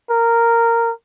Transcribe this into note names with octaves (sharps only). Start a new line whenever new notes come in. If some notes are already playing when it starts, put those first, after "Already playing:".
A#4